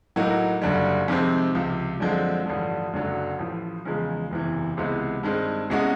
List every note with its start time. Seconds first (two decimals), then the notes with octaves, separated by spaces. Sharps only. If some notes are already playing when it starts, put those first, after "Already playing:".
0.16 A2 F#3 A#3 D#4 F#4
0.62 F#1 F#2 D3 G3
1.08 F2 C3 D#3 G#3 C4
1.55 C#2 C3 F3
2.00 F#2 D3 F3 G#3 C4
2.46 A1 G2 D3 F3
2.93 F#1 F#2 D3 F#3
3.39 A1 A2 F3
3.85 E2 C#3 F3 G#3
4.31 F#1 E2 C3 E3
4.77 C#2 C3 E3 G#3 B3
5.23 G2 D#3 G#3 C4
5.70 C2 B2 G#3 C#4 F#4